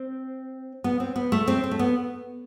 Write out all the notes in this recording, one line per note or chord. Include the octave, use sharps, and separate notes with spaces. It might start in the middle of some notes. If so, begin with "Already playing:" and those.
Already playing: C4
B3
C4
B3
A3
C4
C4
A3
B3